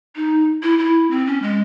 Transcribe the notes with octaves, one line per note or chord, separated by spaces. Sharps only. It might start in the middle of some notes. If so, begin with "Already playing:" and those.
D#4
E4
E4
C4
C#4
G#3